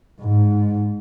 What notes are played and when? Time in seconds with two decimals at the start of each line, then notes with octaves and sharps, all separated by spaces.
0.20 G#2